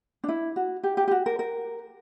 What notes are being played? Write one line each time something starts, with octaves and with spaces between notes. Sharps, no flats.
D4
E4
F#4
G4
G4
G4
F#4
A#4
A#4